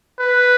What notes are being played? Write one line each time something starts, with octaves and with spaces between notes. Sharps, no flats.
B4